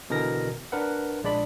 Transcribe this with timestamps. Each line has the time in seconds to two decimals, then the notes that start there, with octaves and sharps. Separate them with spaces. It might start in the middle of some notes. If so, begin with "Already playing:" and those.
0.10 B2 D3 E3 A#4 A#6
0.72 D4 A#4 B4 F#5
1.23 A#1 G#3 D4 D5 B5